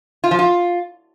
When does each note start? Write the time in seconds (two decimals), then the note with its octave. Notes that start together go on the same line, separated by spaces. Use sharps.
0.24 F4
0.31 F3
0.39 F4